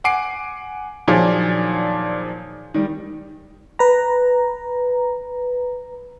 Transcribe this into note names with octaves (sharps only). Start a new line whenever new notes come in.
F#5 G#5 D6 C7 D7
A#2 D#3 F3 F#3 D4 G#4
D#3 G3
B4 A#5